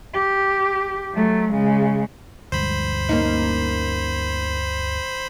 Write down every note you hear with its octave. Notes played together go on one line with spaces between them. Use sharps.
G4
F#3 A3
C#3 G#3
D2 G2 G#3 C5 B5
A#3 C#4 D#4